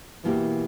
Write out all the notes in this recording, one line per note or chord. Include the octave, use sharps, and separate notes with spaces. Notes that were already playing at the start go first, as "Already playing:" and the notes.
B2 E3 A#3 E4 G4